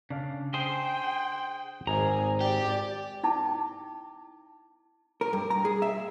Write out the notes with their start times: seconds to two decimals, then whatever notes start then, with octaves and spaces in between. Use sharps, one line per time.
0.10 C#3 D4 D5 F5
0.54 G#4 C5 G5
1.87 G#1 G#4 A#5
2.41 G4 D5
3.23 D#4 E4 G5 A5 D6
5.21 A#4
5.33 G2
5.50 A#5
5.65 G#4
5.82 E5